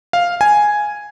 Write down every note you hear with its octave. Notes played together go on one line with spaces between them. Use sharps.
F5
G#5